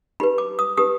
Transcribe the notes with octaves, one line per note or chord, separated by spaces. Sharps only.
D#4 G4 B4 B5
D6
D#6
D#4 G4 B4 D#6